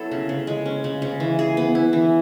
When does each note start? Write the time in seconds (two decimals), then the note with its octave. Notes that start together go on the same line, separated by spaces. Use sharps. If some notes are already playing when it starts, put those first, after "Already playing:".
Already playing: F#3 B3 E4 A4
0.11 C#3
0.29 C#3
0.47 G#3
0.66 C#4
0.84 C#3
1.02 C#3
1.20 E3
1.39 G#4
1.57 B3
1.75 E4
1.93 E3